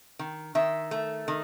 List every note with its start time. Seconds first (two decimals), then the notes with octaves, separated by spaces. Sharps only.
0.19 D#3
0.55 D#3 E5
0.91 A3
1.28 D#3